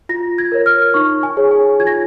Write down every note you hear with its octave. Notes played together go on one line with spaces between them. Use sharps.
F4 A#6
G#6
A#4 C#5
F6
D#4 C#6
G#5
G#4 C#5
G#5
F4 G#6
A#6